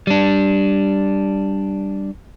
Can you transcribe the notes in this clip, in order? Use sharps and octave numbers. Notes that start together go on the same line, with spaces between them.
G3 D4